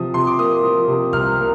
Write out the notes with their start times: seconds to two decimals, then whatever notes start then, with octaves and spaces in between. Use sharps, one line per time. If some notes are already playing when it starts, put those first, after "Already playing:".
Already playing: C3 F3 D#6
0.14 C3 C6
0.27 D6
0.38 A#3 D#6
0.63 F3
0.88 C3
1.13 C2 F6
1.39 A#3